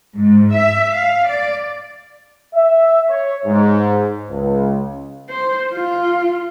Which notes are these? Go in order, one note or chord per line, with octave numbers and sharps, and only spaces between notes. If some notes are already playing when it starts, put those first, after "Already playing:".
G#2
E5
F5
D5
E5
C#5
G#2
C#2
C5
F4